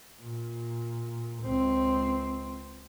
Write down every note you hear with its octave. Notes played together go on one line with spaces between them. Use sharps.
A#2
C#2 C4